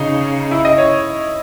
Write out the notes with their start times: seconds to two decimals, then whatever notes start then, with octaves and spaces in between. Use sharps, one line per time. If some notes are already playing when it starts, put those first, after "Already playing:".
Already playing: C#3 D#4
0.51 E4
0.65 D#5
0.78 C#5